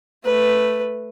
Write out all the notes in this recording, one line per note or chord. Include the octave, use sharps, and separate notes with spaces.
A3 B4